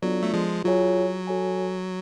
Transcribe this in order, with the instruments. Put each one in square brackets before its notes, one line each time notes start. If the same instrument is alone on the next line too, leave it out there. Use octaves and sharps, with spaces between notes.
[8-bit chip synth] F#3 [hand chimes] B3 D4 F4 A4 D5
[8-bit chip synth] A3
F3 G#3
[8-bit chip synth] F#3 [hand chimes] F4 G#4 C#5 G#5
[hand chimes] F#4 A4 C#5 G#5